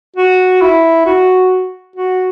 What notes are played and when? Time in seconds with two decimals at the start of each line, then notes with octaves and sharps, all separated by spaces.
0.16 F#4
0.61 E4
1.06 F#4
1.96 F#4